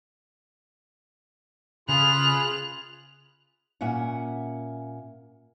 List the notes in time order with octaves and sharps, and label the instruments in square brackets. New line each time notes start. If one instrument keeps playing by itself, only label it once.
[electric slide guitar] C#3 [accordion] F4 G#4 B5 [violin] F#6 F7
[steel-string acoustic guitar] A#2 C#4 E5 F#5